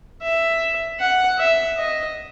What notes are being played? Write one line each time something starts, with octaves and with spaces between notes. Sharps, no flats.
E5
F#5
E5
D#5